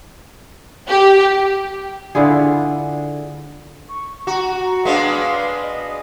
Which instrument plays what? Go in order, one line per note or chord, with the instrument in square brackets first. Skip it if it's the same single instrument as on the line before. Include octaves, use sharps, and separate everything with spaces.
[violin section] G4
[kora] D3 E4 F4 G#4
[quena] C#6
[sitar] F#4 [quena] A#5
[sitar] G#3 B3 D4 [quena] F5
[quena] D#5